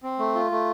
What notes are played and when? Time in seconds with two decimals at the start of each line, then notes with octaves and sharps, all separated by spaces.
0.03 C4
0.19 A3
0.35 F4
0.51 A3